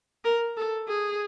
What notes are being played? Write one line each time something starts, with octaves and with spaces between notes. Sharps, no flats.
A#4
A4
G#4